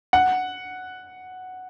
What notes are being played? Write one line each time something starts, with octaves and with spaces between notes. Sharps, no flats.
F#5